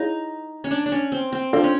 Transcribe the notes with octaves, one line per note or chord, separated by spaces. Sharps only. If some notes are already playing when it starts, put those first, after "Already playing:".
Already playing: D#4 E4 G#4 C#5 F5
C#4
D4
D4
C#4
C4
C4
C4 D4 F4 A4 D5 F5
C#4